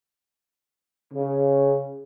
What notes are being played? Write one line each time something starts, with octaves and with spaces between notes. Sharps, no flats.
C#3